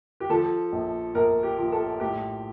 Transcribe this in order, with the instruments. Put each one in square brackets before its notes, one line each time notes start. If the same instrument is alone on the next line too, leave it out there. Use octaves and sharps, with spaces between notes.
[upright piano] G4
F3 A4
A#1
A#1 A#4
G4
F3
A4
A2 G4